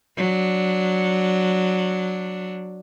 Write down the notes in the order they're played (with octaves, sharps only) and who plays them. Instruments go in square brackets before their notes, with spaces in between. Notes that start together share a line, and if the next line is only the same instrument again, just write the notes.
[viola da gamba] F#3 D4